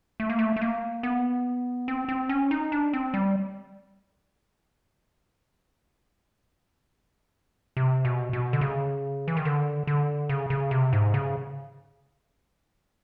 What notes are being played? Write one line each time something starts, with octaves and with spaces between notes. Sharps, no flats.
A3
A#3
A3
A3
A#3
B3
C4
C4
C#4
D#4
D4
C4
G3
C3
B2
B2
D3
C#3
E3
D#3
D3
D3
C#3
C#3
C3
G#2
C#3